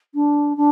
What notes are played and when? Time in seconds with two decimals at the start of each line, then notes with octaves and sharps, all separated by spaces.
0.14 D4
0.57 D4